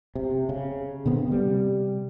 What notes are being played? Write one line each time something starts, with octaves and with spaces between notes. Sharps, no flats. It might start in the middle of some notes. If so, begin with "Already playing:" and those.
C3
C#3
B2 D3 B3 C4
C3 G3